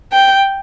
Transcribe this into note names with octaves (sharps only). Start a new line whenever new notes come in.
G5